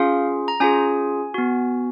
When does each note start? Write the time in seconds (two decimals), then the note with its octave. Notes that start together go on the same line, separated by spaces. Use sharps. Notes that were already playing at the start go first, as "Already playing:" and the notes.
Already playing: C#4 F4 G#4 F5
0.48 A#5
0.60 C#4 F4 G#4 G#5
1.34 B3 F#4